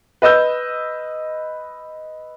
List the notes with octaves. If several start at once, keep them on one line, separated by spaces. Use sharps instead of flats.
B4 D#5 E6 G6